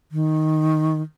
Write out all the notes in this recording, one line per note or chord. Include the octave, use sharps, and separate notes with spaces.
D#3